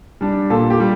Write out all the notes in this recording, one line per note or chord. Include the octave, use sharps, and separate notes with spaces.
G3 D4
A#2 A4
G4
G3